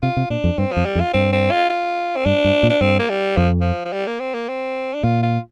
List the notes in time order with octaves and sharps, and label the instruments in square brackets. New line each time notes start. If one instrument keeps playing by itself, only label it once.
[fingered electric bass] C3 [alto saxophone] F4
[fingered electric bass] C3
[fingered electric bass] A#2 [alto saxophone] D4
[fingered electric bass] F2
[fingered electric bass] G2 [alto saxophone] C4
[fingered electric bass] F2 [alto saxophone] F3
[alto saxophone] G3
[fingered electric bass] F2
[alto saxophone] F4
[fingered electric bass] G2 [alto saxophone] C4
[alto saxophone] C4
F4
F4
C4
[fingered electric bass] G2 [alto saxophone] D4
[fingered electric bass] G2
A#2
[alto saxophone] D4
[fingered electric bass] G2 [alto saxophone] C4
[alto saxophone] A#3
G3
[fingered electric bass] F2 [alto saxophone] F3
[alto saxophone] F3
F3
G3
A#3
C4
A#3
C4
D4
[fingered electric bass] A#2 [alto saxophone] F4
[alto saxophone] F4